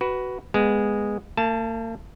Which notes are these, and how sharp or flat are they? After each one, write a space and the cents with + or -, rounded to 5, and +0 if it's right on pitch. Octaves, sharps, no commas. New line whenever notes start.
F#4 +20 B4 +0
G#3 -10 B3 +0
A#3 -45 A5 +0